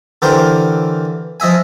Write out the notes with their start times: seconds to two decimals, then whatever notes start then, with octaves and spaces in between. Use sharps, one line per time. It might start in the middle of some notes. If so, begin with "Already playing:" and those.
0.22 D3 E3 G4 A#4 C5
1.40 F3 D#5 E5 G#5